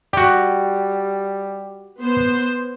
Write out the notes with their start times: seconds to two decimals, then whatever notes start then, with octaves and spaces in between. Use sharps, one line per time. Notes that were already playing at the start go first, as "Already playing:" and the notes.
0.13 G3 F#4 G4
2.00 B3 C5